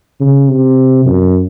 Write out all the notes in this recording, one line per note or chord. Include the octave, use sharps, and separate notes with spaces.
C#3
C3
F#2